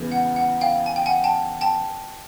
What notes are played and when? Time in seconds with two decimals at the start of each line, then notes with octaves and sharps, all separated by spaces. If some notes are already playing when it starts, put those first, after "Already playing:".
Already playing: E2 C#3 E3 G#3
0.12 F#5
0.36 F#5
0.61 F5 G5
0.86 G#5
0.96 G5
1.06 F#5 G#5
1.24 G5 A5
1.61 G5 A5